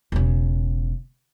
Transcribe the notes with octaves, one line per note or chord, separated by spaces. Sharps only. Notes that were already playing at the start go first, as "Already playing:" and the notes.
E1 C#3